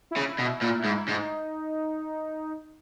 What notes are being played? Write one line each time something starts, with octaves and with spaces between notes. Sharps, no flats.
E4
C#3
E4
B2
E4
A#2 E4
E4
G#2
E4
G#2
D#4